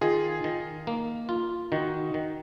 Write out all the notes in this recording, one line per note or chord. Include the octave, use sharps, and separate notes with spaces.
D#3 F4 G#4
D#3
A#3
F4
D#3 D#4 F#4
D#3